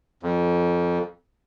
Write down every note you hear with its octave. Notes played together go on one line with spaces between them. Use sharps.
F2